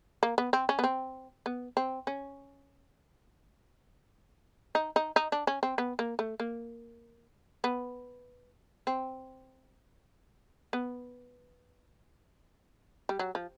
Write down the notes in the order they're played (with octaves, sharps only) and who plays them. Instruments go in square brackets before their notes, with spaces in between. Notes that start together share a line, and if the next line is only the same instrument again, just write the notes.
[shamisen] A#3
B3
C4
C#4
B3
C4
B3
C4
C#4
D#4
D#4
D#4
D4
C#4
C4
B3
A#3
A3
A#3
B3
C4
B3
G3
F#3
F3